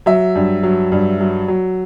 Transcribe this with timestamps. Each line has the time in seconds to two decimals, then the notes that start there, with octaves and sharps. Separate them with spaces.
0.06 F#3 E5
0.35 G2
0.63 F#3
0.92 G2
1.20 F#3
1.48 F#3